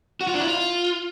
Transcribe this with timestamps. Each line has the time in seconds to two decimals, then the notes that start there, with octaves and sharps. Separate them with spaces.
0.21 F#4
0.27 F4
0.34 D4
0.41 E4
0.47 F4